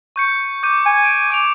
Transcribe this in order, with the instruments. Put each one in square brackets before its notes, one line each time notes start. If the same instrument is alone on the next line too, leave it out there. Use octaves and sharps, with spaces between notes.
[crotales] C#6 G6 C#7
D6 G6 D#7
[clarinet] G#5
[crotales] D7
D6 D7 F7